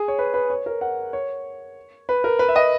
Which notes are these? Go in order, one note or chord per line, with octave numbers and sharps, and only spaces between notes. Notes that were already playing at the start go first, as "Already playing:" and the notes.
Already playing: G#4
C#5
B4
B4
C#5
A#4
F#5
C#5
B4
A#4
B4
E5
D#5